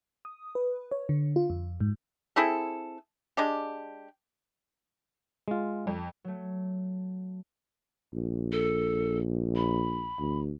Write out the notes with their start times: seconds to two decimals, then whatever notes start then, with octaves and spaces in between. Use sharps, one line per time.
0.25 D#6
0.55 B4
0.91 C#5
1.09 D3
1.36 F4
1.50 F2
1.80 G#2
2.36 C4 E4 G#4 A4
3.37 G#3 D4 G4
5.48 G#3 F4
5.87 F2
6.24 F#3 A3
8.14 A#1
8.52 A4
9.56 B5
10.19 D2